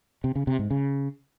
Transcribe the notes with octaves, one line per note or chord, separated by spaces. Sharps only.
C3
C#3
C3
G#2
C#3